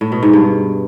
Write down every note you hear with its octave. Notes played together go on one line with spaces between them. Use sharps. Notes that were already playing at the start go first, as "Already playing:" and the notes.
A2
B2
G#2
G2